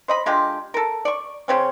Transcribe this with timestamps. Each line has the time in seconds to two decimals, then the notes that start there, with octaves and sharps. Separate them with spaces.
0.08 C5 D#5 B5
0.26 D3 G#3 F4 G4
0.74 A4 A#4
1.05 D5 C#6
1.48 C#3 C4 C#4